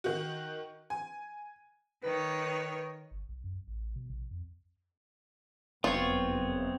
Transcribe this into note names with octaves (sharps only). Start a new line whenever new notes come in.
D#3 F#4
G#5
D#3 B4 C#5
G1
B1
F#2
A1
B2
A#1
F2
F#1 F2 F#3 B3 C4 F4 C#5